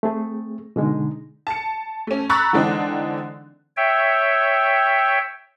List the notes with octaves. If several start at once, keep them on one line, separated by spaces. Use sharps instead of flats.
A3 C4 G#4
B2 D3 G#3 D#4
A5 C#7
A3 C#4
A#5 B5 C#6 E6 F#6 A6
D3 E3 G#3 C4 D4 D#4
C#5 E5 G5